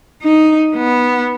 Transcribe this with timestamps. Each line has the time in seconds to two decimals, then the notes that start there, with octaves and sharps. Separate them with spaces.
0.23 D#4
0.75 B3